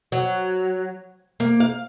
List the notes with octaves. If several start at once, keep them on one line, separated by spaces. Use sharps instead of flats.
F#3
A#3
F5